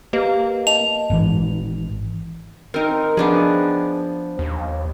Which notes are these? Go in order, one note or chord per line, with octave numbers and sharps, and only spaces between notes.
A#3 G4 B4 D#5
D#5 A5 F7
G#1 G#2 D#3 E3
C4 D#4 A#4
F3 B3 D4 G#4
D#2